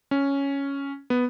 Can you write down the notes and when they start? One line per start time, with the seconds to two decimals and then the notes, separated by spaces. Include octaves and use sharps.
0.11 C#4
1.10 B3